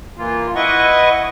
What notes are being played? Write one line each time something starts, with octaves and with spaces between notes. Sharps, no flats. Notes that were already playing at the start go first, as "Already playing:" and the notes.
E3 A#3 F4
E4 B4 D#5 F#5 C#6